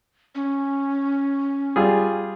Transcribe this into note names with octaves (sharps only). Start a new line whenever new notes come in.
C#4
G3 F4 G#4